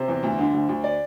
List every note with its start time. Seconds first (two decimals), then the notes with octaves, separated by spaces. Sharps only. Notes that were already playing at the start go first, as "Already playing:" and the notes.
Already playing: C3 C5
0.08 E2
0.23 D2
0.39 D3
0.53 D2
0.69 D2
0.84 D5